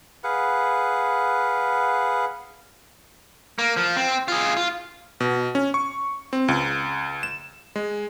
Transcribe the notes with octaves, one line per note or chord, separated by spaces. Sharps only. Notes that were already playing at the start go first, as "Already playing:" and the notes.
G#4 B4 F5 F#5
A#3
F3
C4
F4 G#4
F4
B2
C#4
C#6
C4
C#2
E7
G#3